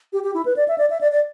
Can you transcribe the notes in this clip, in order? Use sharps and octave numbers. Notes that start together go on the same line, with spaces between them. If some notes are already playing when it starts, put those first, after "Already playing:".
G4
G4
E4
B4
D5
E5
D5
E5
D5
D5